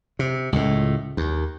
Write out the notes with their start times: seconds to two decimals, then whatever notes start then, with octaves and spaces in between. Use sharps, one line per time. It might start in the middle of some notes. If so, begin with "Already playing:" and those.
0.19 C3
0.52 C#2 A2
1.17 D#2